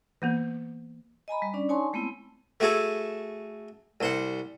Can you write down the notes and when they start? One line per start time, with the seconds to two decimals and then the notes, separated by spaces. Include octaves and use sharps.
0.22 E3 A#3 B3
1.28 D#5 G#5 A#5 B5
1.42 G3
1.53 C#4 D4 D5
1.69 D#4 C#5 G#5 A5 C6 C#6
1.93 G#3 A3 B3 C4 E4
2.60 A3 F#4 G#4 A4
4.01 C2 C5 F#5